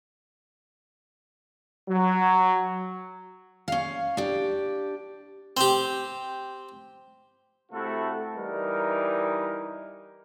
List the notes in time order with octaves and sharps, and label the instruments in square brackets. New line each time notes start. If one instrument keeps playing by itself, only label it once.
[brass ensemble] F#3
[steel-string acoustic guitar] C#4 F5
D4 G4
[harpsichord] C4 G4
[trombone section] C3 A3 E4 F#4 A4
E3 G3 D#4 A#4